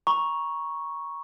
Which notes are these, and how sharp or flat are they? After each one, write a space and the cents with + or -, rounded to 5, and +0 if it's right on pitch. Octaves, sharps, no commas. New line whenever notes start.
A#5 +25 C#6 +0